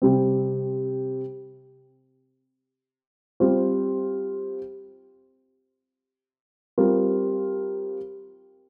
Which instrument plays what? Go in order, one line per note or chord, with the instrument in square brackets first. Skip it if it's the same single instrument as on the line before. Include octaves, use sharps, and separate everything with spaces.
[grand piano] C3 G3 C4
G3 C4 F4 C5
G3 C4 F4 A#4